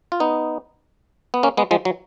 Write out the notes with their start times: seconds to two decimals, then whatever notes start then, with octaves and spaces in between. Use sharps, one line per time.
0.12 F4
0.20 B3 D#4
1.34 B3
1.43 A#3 C#4
1.57 G#3 B3
1.71 F3 G#3
1.85 F#3